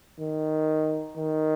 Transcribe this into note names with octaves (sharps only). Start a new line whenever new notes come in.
D#3
D#3